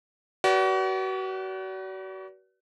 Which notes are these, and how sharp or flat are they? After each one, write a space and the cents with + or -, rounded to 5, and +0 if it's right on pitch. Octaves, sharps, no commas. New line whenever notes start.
F#4 +35 B4 -30 D5 -35